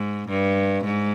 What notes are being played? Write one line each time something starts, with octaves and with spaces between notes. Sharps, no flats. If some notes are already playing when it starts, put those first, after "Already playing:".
Already playing: G#2
G2
G#2